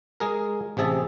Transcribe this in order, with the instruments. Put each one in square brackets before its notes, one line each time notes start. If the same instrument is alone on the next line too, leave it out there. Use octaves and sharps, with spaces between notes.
[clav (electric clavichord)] G#3 G#4 A#4
A1 C3 G#4 E5 A5